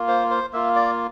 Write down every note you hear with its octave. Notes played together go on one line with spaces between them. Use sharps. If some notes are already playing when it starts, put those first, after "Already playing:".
Already playing: A#3 F4
C5
C5
A#3 F4 E5
D5